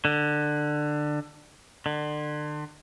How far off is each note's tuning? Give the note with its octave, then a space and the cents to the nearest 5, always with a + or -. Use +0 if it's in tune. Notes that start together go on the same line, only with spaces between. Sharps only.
D3 +20
D3 +35